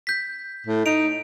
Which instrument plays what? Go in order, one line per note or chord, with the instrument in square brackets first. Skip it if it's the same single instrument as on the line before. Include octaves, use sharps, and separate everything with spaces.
[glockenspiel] G6 B6
[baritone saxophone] A2
[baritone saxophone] D#4 [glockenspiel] D7 F7